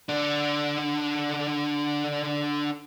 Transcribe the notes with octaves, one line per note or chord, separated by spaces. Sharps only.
D3 D4